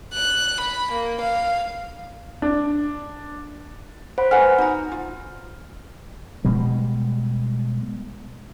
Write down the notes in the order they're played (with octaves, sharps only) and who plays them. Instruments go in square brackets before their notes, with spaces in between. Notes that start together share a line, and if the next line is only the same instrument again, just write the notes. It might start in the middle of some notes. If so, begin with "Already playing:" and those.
[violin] F#6
B5
A#3
F5
[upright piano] D4
[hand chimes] C5 F#5 B5
[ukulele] B4 F#5 G#5 [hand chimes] F6
[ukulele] D#4 F#4 A#5
F4
[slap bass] B2 G3 G#3